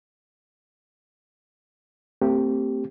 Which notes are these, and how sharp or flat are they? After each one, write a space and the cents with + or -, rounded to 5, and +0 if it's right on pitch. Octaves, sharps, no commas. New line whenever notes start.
A3 +45 C4 +0 G4 +0